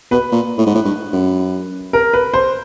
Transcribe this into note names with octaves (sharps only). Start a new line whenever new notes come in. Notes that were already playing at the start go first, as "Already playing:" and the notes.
B2 B4
A#2
A2
G#2
A2
G2
F#2
A#4
B4
C5